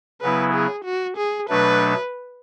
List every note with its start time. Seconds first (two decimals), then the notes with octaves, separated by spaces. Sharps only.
0.22 C#3 F#3 B3 E4 B4
0.54 G#4
0.85 F#4
1.18 G#4
1.49 B2 F#3 A3 D4 B4